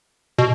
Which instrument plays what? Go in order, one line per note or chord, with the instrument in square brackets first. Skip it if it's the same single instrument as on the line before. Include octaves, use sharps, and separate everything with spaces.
[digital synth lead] B2